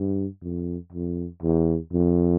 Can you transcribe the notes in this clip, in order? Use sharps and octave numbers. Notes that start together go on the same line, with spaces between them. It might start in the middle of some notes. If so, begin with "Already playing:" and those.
Already playing: G2
F2
F2
E2
F2